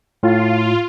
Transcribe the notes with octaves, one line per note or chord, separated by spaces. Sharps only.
A2 F4